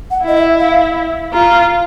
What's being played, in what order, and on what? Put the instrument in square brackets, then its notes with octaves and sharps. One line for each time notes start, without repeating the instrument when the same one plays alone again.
[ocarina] F#5
[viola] E4 [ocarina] D#5
[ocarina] E5
F5
[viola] F4 [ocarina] A#5